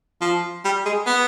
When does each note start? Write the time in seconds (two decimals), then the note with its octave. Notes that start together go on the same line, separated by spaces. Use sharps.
0.21 F3
0.64 G3
0.86 G#3
1.07 B3